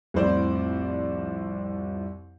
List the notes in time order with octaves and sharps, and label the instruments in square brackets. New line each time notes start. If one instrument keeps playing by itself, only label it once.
[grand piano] C2 F2 A2 C4 C5 D5